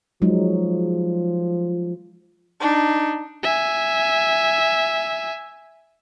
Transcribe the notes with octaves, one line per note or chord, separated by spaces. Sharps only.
F3 F#3 G#3 D#4
D4 D#4
E5 G#5